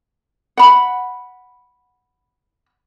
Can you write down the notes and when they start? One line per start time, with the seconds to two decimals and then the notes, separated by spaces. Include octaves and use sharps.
0.57 F#5 B5